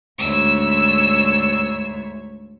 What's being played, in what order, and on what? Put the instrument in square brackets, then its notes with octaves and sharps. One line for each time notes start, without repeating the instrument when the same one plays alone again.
[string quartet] D2 G#2 C#5 [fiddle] E6